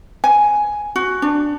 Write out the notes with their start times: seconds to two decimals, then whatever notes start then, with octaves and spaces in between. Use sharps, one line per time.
0.24 G#5
0.96 F#4
1.22 D4